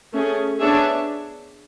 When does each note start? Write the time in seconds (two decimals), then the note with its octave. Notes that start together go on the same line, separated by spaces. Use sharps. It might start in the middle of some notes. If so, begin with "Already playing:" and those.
0.14 A3 C#4 G#4
0.60 B3 D4 G#4 C#5 E5